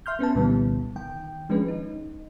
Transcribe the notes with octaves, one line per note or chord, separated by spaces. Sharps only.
E5 C6 F6 G6
B3 C#4 B4 A5
C2 A#2 D3 E3 G3 B3
D#3 G5
D#3 F3 G#3 C#4 D4 B4
D#4